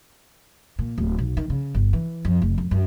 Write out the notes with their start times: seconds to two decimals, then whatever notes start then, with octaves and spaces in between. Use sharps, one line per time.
0.79 A#2
0.98 D1
1.18 B1
1.37 D#3
1.50 C#3
1.75 G1
1.93 E3
2.25 F2
2.42 F1
2.58 F2
2.71 F#2